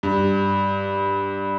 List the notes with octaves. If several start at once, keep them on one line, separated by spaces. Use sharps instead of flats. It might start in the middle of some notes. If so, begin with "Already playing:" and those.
G2